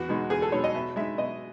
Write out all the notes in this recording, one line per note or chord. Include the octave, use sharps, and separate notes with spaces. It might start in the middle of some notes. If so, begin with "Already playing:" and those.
Already playing: E2 F#4
B2 G#3 D#4
E2 G#4
A4
B2 G#3 D#4 C#5
D#5
B2 E5
G#3 D#4 E5
B2 D#5